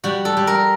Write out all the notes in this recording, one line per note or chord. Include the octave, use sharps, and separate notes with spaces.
G3 F#4
A4
G3
A#4